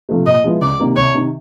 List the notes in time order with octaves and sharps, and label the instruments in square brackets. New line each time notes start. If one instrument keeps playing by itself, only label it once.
[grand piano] C3 F3 A3
[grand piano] A#2 [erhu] D#5
[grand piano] F3 G#3 B3 E4
[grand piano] C#2 [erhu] D5
[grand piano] C3 D#3 G3 A#3
[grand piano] C2 [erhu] C#5
[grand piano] C3 D#3